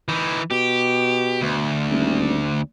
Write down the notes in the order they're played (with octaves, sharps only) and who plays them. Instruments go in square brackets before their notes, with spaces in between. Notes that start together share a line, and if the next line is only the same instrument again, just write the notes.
[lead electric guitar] E3 D#4
[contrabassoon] B2 [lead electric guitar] G4
[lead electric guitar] D2
[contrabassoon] D#1